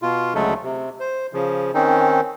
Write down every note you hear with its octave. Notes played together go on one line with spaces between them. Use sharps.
B2 F4
D2 C#3 F#3 G#3 A3 A4
C3
C5
C#3 F3
D#3 C4 C#4 D#4